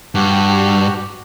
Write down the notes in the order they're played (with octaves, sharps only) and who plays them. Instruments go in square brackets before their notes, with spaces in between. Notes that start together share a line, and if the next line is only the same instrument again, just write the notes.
[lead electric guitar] G2 [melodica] F#4 G4